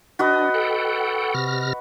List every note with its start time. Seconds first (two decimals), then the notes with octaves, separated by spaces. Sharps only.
0.19 D4 F#4 B4 D#5
0.54 A4 F#5 G5
1.34 C3 F6 A#6